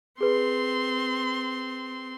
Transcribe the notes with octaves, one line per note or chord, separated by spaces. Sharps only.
C4 G#4 B4 C6